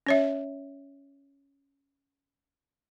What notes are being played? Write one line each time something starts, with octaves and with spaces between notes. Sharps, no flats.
C#4 C#5 E5